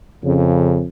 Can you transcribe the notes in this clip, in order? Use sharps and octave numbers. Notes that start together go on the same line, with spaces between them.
F2 C#3